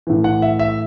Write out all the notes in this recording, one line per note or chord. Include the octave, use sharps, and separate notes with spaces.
A2 E3
F#5
E5
E5